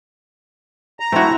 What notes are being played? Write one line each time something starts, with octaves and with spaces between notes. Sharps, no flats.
A#5
A3 C4 E4 F#4